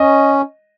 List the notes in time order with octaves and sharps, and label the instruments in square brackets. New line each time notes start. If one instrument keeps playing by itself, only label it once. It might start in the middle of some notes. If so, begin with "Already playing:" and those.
Already playing: [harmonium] C#4 [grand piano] D#5